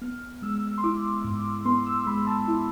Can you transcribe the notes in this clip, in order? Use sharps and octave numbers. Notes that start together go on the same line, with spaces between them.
B3 F6
G#3 E6
C6
E4 D6
G#2
B3 C6
E6
G#3 B5
A5
E4